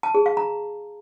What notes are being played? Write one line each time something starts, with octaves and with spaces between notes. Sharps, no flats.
A5
G#4
F5
A#5